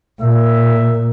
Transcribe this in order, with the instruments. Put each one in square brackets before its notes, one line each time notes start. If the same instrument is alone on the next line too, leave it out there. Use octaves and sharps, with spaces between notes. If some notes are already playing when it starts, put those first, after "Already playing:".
[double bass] A#2 [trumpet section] E5